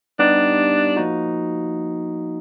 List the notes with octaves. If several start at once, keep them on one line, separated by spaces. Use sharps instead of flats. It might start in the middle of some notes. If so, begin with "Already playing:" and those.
G3 B3 D4 D#4 G4
F3 A#3 D#4 F#4